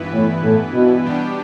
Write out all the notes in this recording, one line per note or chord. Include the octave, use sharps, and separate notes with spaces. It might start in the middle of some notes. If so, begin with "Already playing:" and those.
Already playing: G2 E3 B3 E4 B4
A2
A2
B2
B2 G3 B3 D4 G4